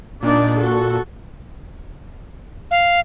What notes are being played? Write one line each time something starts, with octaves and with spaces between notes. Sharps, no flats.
A#2 D4 D#4 D5
F#4 A4
F5